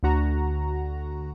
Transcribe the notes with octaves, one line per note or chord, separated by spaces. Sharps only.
D2 D3 F#4 A#5